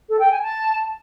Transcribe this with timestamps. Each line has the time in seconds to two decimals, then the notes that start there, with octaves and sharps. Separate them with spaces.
0.09 A4
0.19 G5
0.30 G#5
0.41 A5